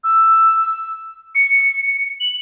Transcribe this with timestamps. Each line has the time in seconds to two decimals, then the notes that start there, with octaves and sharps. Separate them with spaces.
0.04 E6
1.35 C#7
2.20 F#7